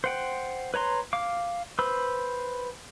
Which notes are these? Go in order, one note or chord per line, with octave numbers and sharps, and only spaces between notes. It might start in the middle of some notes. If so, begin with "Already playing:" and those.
C5 F#5 G5
B4 C#5 A#5 C6
F5 D6
B4 C5 B5 E6